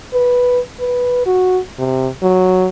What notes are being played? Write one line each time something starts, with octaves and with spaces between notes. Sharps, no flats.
B4
B4
F#4
C3
F#3